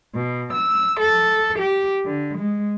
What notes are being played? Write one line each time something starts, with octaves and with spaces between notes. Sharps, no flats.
B2
E6
A4
G4
D3
G#3